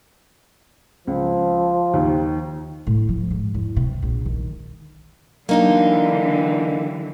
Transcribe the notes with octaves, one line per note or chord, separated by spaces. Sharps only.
C#2 F3
D#2 D#3
A2
F3
G#2
E2
C3
A#1
D#3
D3 E3 F#3 A#3 D4 D#4 G4